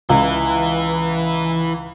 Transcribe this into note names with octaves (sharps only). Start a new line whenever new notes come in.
C#2 E3 E4